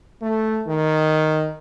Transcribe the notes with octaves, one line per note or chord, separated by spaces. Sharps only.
A3
D#3